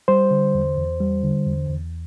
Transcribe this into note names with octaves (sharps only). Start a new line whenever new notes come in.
G3 C5
D3
E2
E2
G3
D3
E2
E2